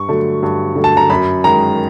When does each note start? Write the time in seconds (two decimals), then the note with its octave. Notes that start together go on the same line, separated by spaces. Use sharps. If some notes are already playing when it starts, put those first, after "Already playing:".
Already playing: G2 C#6
0.08 D3 F#3 A3
0.43 G2
0.76 D3 F#3 A3
0.84 A5
0.97 A#5
1.10 F#2 B5
1.44 D#3 G#3 A#5